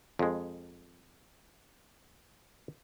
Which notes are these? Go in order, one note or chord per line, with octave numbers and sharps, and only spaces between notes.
F2 G#3